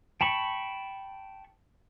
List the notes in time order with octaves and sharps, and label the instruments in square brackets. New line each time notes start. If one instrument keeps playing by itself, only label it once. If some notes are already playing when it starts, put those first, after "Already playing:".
[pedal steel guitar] G5 A5 B5 C#6